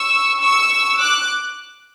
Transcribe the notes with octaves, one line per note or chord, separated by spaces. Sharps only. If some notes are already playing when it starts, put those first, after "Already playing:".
Already playing: C#6 E6
C#6 E6
D6 F#6